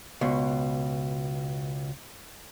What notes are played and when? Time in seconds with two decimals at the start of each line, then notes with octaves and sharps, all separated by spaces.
0.21 C#2 B2